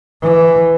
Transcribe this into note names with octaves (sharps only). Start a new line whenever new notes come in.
E3